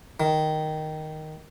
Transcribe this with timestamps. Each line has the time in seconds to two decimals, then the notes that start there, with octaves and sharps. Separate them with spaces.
0.20 D#3